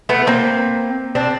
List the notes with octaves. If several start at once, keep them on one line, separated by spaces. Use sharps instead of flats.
A3 B3
A#3 C4
C4 D4